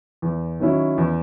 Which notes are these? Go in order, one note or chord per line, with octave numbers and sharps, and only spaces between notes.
E2
D#3 F#3 C#4 E4
E2